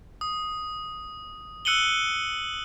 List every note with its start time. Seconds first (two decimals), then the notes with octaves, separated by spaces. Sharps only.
0.21 D#6
1.65 E6 F#6 C#7 D#7 F#7 G7